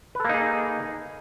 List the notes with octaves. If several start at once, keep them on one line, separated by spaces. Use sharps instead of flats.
A#3 D#4 G#4 A4 B4